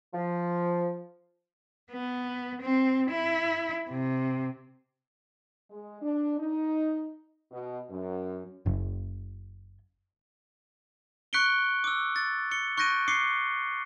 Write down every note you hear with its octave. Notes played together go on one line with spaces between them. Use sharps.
F3
B3
C4
E4
C3
G#3
D4
D#4
B2
F#2
F#1
C#6 F#6 B6 C#7 D7 G7
D6 E6
A6
C#7 G7
C#6 F#6 G6 A#6 D7 D#7
D6 C7 C#7 G7